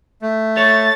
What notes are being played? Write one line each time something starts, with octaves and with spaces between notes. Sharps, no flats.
A3
A4 C#5 A6